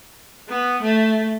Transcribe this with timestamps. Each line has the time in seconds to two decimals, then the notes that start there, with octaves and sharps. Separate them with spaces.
0.49 B3
0.82 A3